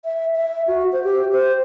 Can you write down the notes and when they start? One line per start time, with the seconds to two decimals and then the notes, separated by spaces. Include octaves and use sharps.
0.05 E5
0.36 E5
0.68 F#4
0.93 C5
1.04 G4
1.32 C5